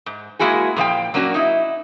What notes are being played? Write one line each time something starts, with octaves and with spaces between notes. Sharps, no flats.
G#2
G#3 A#3 E4 F#4 G#4
A#2 F3 F5 G5
F#3 A#3 C#4 D4 F#4
D#4 E4